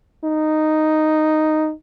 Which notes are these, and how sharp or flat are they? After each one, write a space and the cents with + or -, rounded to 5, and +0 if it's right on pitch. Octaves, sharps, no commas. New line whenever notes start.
D#4 -5